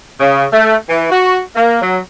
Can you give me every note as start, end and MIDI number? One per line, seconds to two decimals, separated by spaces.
0.19 0.44 49
0.52 0.74 57
0.88 1.09 52
1.10 1.38 66
1.55 1.78 58
1.81 1.98 54